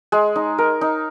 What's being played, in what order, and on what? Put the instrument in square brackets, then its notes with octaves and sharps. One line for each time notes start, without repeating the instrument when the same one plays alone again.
[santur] G#3
D#4
A#4
D#4